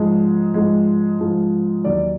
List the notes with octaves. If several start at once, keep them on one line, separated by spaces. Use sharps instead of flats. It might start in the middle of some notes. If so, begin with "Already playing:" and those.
Already playing: G#2 F3 G#3
G#2 F3 G#3
G#2 F3 G#3
D#2 D#3 F#3 D5